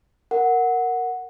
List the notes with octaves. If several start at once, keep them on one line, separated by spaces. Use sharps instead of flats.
A#4 F#5